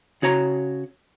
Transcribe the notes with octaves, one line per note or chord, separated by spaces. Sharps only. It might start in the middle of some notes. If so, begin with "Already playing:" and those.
C#3 F#4 C#5 A#5